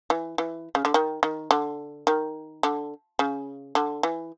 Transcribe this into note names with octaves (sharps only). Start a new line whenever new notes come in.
E3
E3
C#3
D3
D#3
D#3
D3
D#3
D3
C#3
D3
E3